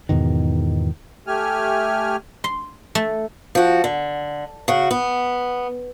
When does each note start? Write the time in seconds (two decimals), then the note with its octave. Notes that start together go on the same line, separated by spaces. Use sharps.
0.09 E2 G#2 B2 D#3
1.27 A3 G4 G#5 F6
2.44 C6
2.95 A3
3.55 F3 F#4
3.84 D3
4.68 C#3 F#4
4.91 B3